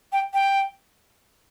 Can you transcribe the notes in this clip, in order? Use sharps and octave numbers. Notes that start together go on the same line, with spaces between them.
G5
G5